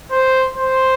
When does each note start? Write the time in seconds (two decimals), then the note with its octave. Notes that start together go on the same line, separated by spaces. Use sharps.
0.11 C5
0.57 C5